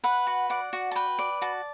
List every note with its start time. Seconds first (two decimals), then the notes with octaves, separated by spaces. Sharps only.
0.04 B4 F#5
0.27 F#4
0.50 D5 F#5
0.73 F#4
0.91 A5
0.95 B4 G5
1.19 D5
1.42 F#4 A5